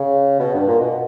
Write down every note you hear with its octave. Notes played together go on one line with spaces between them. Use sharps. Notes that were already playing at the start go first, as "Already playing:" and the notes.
Already playing: C#3
B2
G2
A#2
B2